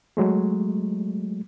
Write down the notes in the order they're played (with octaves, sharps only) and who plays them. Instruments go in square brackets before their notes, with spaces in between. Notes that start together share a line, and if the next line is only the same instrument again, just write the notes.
[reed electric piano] F#3 G#3 A3